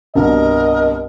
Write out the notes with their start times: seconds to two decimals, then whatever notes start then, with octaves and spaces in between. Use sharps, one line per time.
0.15 C2 G2 B2 A#4 D#5